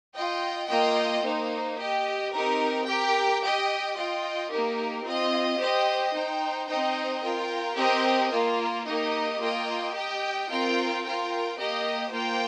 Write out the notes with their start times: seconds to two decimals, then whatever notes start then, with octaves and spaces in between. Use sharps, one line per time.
0.15 F4 D#5 G5
0.69 A#3 F4 D#5 G5
1.24 A#3 D#4 C5
1.78 G4 D#5 G5
2.32 C4 D#4 G4 A#4
2.87 G4 A#4 G5
3.41 G4 D#5 G5
3.96 F4 D#5 G5
4.50 A#3 D#4 G4 A#4
5.04 C4 F4 D#5
5.59 G4 C5 D#5 G5
6.14 D#4 C5 G5
6.68 C4 D#4 C5 D#5 G5
7.22 F4 A#4 G5
7.77 C4 G4 A#4 D#5 G5
8.31 A#3 F4 A#4
8.86 A#3 D#4 G4 A#4 D#5
9.41 A#3 F4 A#4 D#5 G5
9.95 G4 D#5 G5
10.49 C4 F4 A#4 G5
11.04 F4 A#4 G5
11.59 A#3 G4 D#5 G5
12.12 A#3 F4 C5 G5